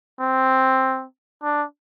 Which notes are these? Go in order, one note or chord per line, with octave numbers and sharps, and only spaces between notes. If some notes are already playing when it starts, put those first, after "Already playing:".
C4
D4